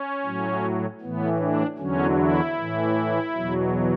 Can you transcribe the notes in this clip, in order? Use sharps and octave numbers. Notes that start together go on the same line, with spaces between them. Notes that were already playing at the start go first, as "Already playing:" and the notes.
Already playing: C#4
A2 F#3
A2 E3 B3
D4
E2 D3 F#3 C#4
E4
A2 E3
E2 B2 F#3